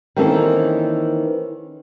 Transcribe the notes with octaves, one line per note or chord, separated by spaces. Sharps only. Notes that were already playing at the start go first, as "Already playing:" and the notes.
D#3 E3 A#3 C4 C#4 A4